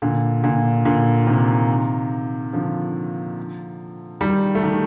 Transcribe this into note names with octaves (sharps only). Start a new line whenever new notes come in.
A#2 D3
A#2 D3
A#2 D3
C3 D#3
D3 F3
D#3 G3
A3
D#3 G3